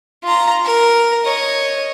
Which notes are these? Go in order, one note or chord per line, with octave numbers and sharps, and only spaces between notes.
F4 A#5
A#4
C#5 D#5